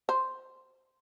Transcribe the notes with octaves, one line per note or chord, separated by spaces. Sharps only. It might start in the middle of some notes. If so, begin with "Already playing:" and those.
C5